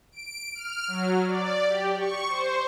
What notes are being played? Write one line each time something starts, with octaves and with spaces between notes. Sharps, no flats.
D7
F6
F#3
D5
G4
C#6
C5